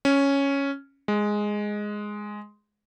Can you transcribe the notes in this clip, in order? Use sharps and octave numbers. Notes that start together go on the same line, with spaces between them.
C#4
G#3